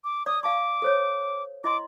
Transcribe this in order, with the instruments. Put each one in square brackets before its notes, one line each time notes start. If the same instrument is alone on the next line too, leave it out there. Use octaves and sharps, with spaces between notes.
[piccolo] D6
[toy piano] D5 D6 [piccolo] D#6
[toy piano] F5 A5 C#6 [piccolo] D6
[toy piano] A4 C5 C#5
[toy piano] E4 D#5 C6 [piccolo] D6